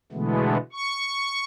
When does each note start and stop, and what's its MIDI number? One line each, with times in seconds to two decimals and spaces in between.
0.12 0.58 47
0.12 0.58 50
0.12 0.58 52
0.12 0.58 56
0.12 0.58 57
0.12 0.58 59
0.73 1.45 85